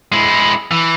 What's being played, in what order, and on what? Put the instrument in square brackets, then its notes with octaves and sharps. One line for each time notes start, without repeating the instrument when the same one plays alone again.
[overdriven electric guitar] G#3 E4
E3